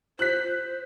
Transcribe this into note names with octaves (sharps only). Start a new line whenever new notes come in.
C5 F#6 B6